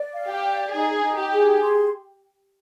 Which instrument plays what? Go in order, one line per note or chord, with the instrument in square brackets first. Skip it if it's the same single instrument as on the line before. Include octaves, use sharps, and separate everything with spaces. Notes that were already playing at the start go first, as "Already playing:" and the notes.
Already playing: [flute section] D5
F5
[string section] G4
[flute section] D5
[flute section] D#4 [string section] G#4
[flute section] D#4
[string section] G4
[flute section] G#4
C6